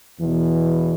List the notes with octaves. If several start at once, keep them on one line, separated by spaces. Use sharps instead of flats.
E2 B2 E3